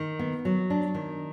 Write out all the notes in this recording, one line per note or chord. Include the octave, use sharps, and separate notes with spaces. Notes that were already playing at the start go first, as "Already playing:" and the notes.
Already playing: D#3
B3
F#3
D4
D#3